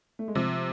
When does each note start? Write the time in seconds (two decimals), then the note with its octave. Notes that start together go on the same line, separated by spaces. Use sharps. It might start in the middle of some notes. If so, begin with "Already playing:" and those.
0.19 A3
0.28 G#3
0.35 C3 F3